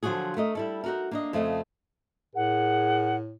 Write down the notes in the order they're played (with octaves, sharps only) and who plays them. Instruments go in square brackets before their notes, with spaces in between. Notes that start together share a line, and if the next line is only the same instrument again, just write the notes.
[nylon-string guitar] D3 F3 F#3 F4 F#4 G#4
A3 A#4 D#5
G3 E4 A4
D#4 F#4 A#4
A#3 D4 D#5
F2 C#3 A3 F4 D#5
[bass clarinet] A2 [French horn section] G#4 A#4 [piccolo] F#5